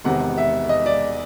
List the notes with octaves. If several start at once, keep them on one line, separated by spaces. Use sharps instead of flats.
E1 E2 C3 D#3 F#5
E5
D#5
D5